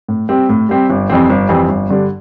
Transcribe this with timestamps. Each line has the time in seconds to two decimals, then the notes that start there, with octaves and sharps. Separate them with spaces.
0.08 A2
0.29 G3 C4 G4
0.49 A2
0.69 G3 C4 G4
0.90 G1
1.10 F2 E3 G3 C4
1.30 G1
1.49 F2 E3 G3 C4
1.69 G1
1.89 G2 D3 G3 D4